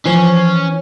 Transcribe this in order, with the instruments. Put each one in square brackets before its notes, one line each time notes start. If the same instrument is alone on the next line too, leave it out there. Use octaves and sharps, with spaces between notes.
[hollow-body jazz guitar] E3 [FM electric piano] F3 C5 C7 [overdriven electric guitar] C#4